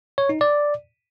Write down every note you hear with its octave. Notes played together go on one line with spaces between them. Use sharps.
C#5
D#4
D5